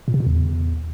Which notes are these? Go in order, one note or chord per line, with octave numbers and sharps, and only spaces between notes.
A#2
C3
A#2
E2